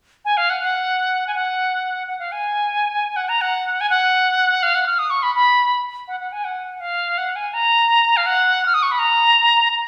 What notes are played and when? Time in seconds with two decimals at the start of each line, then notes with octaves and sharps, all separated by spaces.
0.25 G#5
0.37 F5
0.50 F#5
0.61 F#5
1.27 G#5
1.35 F#5
2.07 F#5
2.19 F5
2.32 G#5
3.16 F#5
3.29 A#5
3.41 F#5
3.81 G#5
3.90 F#5
4.63 F5
4.75 F#5
4.86 F6
4.99 D#6
5.10 C#6
5.23 B5
5.35 B5
6.08 F#5
6.20 F#5
6.32 G#5
6.44 F#5
6.80 F5
7.18 F#5
7.36 G#5
7.54 A#5
8.17 F5
8.26 F#5
8.66 F6
8.74 D#6
8.83 C#6
8.91 B5
8.99 A#5
9.72 A#5